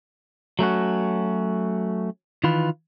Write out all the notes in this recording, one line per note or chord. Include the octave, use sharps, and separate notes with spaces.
F#3 A3 C#4 F#4
D#3 E3 F4 B4